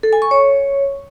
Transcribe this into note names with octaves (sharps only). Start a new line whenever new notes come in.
A4
G#5
C#6
C#5